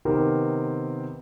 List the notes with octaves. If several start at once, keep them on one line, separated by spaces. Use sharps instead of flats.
C3 D#3 B3 C4 G4 A#4